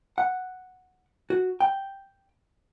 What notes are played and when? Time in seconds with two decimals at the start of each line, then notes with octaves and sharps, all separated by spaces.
0.18 F#5
1.30 F#4
1.60 G5